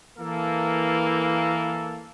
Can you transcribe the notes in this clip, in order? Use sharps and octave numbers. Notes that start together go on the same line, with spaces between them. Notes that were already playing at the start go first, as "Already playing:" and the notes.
E3 A#3 A4